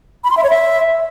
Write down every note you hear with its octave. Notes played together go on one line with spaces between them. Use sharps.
B5
C6
E5
C#5
E5